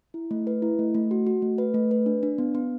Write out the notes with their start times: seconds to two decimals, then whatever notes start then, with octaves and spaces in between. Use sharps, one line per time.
0.14 E4
0.31 A3
0.47 B4
0.62 E4
0.79 A3
0.95 A3
1.11 F#4
1.27 F#4
1.42 A3
1.58 B4
1.74 A3
1.91 B4
2.06 D4
2.23 D4
2.38 B3
2.55 B3